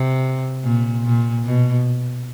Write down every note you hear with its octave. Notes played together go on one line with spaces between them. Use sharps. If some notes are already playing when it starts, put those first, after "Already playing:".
Already playing: C3
A#2
A#2
B2